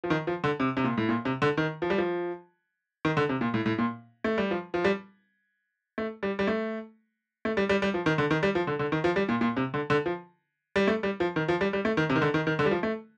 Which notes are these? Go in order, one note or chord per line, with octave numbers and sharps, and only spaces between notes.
F3
D#3
F3
D3
C3
C3
A#2
A2
A#2
C3
D3
D#3
F3
G3
F3
D#3
D3
C3
A#2
A2
A2
A#2
A3
G3
F3
F3
G3
A3
G3
G3
A3
A3
G3
G3
G3
F3
D#3
D3
D#3
G3
F3
D3
D3
D#3
F3
G3
A#2
A#2
C3
D3
D3
F3
G3
A3
G3
F3
D#3
F3
G3
G3
A3
D#3
C3
D#3
D3
D#3
D#3
D3
G3
F3
A3